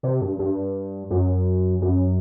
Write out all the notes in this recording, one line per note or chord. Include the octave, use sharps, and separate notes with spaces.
C3
G2
G2
F#2
F#2